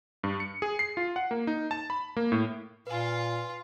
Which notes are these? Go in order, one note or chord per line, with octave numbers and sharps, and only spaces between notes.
G2
C#7
G#4
C7
F4
F#5
A#3
D#4
A5
B5
A#3
A2
A#2 F4 B4 F5 G#5